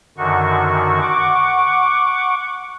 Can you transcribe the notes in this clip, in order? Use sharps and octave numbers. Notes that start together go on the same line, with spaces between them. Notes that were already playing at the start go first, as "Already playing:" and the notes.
F#2 D3 D#3 F#4 C#6
F#5 C#6 D6